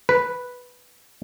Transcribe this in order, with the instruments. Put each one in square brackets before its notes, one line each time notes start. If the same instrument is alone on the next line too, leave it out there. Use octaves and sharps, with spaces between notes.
[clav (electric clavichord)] B4